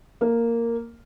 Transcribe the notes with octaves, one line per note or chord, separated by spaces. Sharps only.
A#3